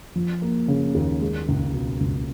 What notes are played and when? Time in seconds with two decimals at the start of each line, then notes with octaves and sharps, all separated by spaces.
0.15 F3
0.42 A#3
0.68 C#3
0.95 D#2
1.21 G#3
1.49 C#2
1.74 B2
2.01 C#2